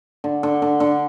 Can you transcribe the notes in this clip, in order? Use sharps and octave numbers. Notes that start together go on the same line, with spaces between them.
D3
D3
D3
D3